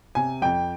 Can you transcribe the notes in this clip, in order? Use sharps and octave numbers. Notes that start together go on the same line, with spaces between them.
C3 G#5
F2 G5